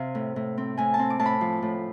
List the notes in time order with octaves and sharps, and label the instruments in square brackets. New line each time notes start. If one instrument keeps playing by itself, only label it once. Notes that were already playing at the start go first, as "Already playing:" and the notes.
Already playing: [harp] C3 F5
A2
A2
C4
A2 G#5
A5
C4
D6
A2 A5
B5
F3
A2